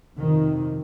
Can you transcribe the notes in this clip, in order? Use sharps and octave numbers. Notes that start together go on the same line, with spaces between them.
F2 C3 D#3